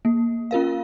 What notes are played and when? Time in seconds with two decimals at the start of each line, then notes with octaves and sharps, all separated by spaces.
0.05 A#3
0.51 C#4 F4 A#4 F5